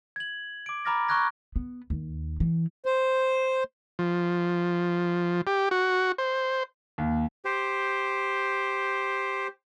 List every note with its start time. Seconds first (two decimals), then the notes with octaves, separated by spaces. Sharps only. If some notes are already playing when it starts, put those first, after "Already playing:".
0.16 G#6 F#7
0.66 D6 D7
0.85 A#5 B5 D6 F6 A6 A#6
1.08 A#5 C#6 F6 F#6 G#6 A#6
1.56 B3
1.90 D#2
2.40 E3
2.86 C5
3.99 F3
5.47 G4
5.71 F#4
6.18 C5
6.98 D#2
7.45 G4 C5